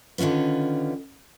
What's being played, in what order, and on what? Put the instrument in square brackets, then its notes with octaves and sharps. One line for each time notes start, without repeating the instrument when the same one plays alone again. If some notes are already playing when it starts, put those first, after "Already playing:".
[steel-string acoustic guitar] D3 D#3 C#4 F4 B4